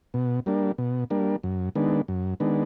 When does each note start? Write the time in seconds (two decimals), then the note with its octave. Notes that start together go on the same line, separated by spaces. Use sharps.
0.14 B2
0.46 G3 A#3 D4
0.78 B2
1.10 G3 A#3 D4
1.43 F#2
1.75 D#3 G#3 B3 D4
2.08 F#2
2.40 D#3 G#3 B3 D4